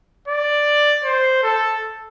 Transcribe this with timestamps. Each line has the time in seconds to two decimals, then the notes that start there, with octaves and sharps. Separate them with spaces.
0.28 D5
1.04 C5
1.43 A4